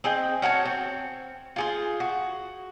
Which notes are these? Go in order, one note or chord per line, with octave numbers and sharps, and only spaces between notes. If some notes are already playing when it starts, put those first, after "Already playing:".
C4 G#4 D#5 G5
C#4 F#4 A4 C#5
C4
F4 G#4 C5
F#4